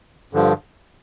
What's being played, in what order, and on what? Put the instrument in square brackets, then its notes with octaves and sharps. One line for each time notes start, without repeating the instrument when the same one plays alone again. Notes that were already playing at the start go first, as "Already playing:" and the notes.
[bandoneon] G2 D3 F3